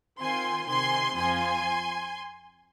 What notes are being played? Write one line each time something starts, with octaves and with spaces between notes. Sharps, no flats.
D#3 C4 F4 G#5 C6
C3 D#3 C4 G#5 C6
F2 F3 C4 F4 G#5 C6